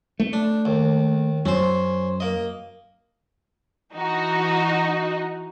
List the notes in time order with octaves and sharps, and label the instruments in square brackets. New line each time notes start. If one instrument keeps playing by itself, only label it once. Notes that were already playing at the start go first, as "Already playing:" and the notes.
[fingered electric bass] A3
[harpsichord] D4
D#2
[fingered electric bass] F#2 [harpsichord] C#4 C5
[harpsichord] A#3 D#5
[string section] E3 D#4 F#4